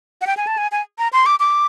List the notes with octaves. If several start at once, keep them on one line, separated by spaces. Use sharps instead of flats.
F#5
G5
G#5
A5
G#5
G#5
A#5
C6
D6
D6